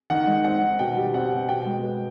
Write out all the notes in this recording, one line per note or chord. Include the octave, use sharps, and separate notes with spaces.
D#3 F#5
G#3
C4 F#5
D#3
B2 G5
G3
C4 F#5
B2
B2 G5
G#3
B3